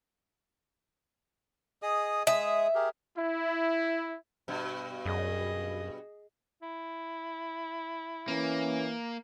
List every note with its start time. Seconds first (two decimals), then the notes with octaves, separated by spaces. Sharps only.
1.82 G#4 D#5 D#6
2.27 G#3 G#4 E5 D#6
2.75 G4 G#4 A#4
3.16 E4
4.48 G2 B2
5.06 F#2 G#4 D#5
6.62 E4
8.28 E3 A#3 C#4